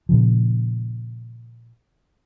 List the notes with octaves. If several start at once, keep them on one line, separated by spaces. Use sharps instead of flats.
A#2 C#3 F3